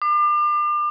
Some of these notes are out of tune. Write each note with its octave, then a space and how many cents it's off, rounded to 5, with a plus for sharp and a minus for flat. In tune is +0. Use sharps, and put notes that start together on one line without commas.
D6 +35